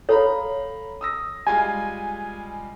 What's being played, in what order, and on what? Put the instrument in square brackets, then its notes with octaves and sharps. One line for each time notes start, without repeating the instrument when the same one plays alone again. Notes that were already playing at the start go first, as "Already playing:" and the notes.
[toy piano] A4 C#5 [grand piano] F5 A#5 B5
[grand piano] D#6 E6 A#6
[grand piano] G3 G#3 F4 [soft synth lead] G#5